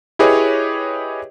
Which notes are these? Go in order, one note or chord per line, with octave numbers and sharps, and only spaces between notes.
E4 G4 G#4 B4 C#5 D#5